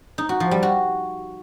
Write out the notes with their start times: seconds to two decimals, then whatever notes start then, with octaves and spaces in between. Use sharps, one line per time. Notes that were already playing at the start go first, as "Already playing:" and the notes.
0.18 D#4
0.29 F#4
0.40 F3
0.51 G3
0.63 F#4